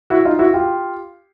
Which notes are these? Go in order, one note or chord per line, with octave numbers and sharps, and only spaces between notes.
E4 F#4
D#4 F4
E4 F#4
F4 G4